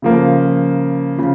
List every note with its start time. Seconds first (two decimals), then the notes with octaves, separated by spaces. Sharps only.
0.02 C#3 F3 A#3
1.18 C#3 F3